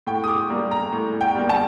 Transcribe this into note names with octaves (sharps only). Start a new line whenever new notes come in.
A2 G5
D#6
D6
G3 A#3
A#5
A2
G5
G3 A#3
A5